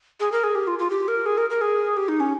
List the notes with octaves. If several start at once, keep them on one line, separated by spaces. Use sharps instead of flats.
G#4
A#4
G#4
G4
F4
F4
G4
A#4
G#4
A#4
A#4
G#4
G4
D#4
C#4